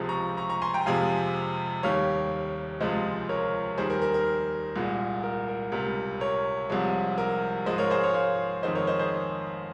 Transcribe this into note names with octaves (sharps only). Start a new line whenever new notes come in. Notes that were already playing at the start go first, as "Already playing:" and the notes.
Already playing: C#2 C3 F3 G#3
A#5 C#6
A#5 C#6
A#5 C#6
G#5 C6
G5 A#5
F2 C3 F3 G#3 F5 G#5
D#2 D#3 G3 C#5 F5
C#2 C3 F3 G#3 C5 D#5
A#4 C#5
D#2 D#3 G3 G#4 C5
A#4
A#4
A#4
C2 A#2 G#3
A#4
A#4
C#2 C3 G3 A#4
A#4 C#5
C2 C3 F3 G#3
A#4
G#2 F3 G#3 C5 D#5
A#4 C#5
G#4 C5
A#4 C#5
C#5 F5
F2 D#3 G#3 C5 D#5
A#4 C#5
C5 D#5
G#4 C5